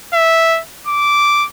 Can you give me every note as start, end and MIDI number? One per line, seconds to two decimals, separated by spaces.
0.13 0.60 76
0.87 1.46 86